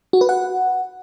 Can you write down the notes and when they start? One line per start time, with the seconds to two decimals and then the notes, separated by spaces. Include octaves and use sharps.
0.13 F#4
0.21 B4
0.29 F#5